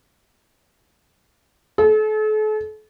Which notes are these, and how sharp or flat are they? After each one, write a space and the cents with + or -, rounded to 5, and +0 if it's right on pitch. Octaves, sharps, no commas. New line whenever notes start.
A4 -40